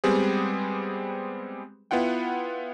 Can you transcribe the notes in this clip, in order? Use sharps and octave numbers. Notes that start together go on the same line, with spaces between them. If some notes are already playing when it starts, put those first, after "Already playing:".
G3 G#3 B3 C4 G4 G#4
B3 E4 F4 F#5 G5